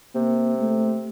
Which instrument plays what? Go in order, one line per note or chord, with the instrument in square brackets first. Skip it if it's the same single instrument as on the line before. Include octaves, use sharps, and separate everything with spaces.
[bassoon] C3 [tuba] A#3
[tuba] A3